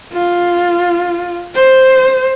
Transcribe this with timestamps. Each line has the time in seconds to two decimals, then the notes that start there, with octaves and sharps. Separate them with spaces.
0.13 F4
1.55 C5